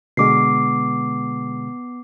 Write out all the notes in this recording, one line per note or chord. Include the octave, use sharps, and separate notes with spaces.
B2 D3 G#3 B3 D6 C7